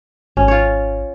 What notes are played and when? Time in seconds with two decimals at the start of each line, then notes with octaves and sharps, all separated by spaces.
0.37 G#1 C#4
0.48 F4 C#5